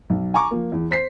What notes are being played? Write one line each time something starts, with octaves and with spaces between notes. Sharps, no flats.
B1
G#5 A#5 C#6 D6
F3 A#3
E2
C5 B6 C7